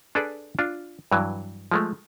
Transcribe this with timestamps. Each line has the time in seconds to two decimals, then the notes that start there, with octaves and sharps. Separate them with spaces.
0.15 D4 G#4 A4 B4 D5
0.59 D4 F4
1.12 G2 E3 F#3
1.71 F3 G#3 A3